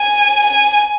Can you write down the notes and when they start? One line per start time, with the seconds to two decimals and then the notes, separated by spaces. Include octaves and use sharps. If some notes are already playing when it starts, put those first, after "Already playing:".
Already playing: G#5
0.45 G#5